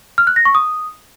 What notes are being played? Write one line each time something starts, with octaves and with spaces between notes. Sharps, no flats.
F6
F#6
A#6
C#6
D#6